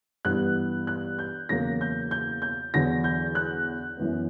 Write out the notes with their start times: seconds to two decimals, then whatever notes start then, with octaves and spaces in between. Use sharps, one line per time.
0.25 G2 E3 B3 F#6
0.87 F#6
1.19 G6
1.49 E2 C#3 F#3 A#3 A#6
1.81 G6
2.11 G6
2.42 G6
2.74 E2 D3 F#3 A#6
3.04 G6
3.35 F#6
3.97 F#2 E3 B3